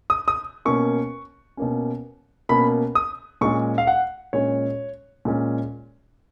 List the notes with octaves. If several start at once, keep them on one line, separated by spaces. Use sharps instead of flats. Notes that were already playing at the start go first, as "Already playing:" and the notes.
D#6
D#6
B2 A#3 C#4 C#6
B2 A#3 C#4
B2 A#3 C#4 B5
D#6
A#2 G#3 C#4 C#6
F5
F#5
A#2 G#3 C#4 C#5
A#2 G#3 C#4